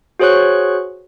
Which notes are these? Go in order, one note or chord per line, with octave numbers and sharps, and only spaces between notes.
F#4 G#4 C5 C#5 C#6 F#6